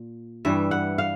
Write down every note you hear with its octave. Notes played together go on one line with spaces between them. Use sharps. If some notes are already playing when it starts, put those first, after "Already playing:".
Already playing: A#2
G2 E3 G3 E5
F#5
F5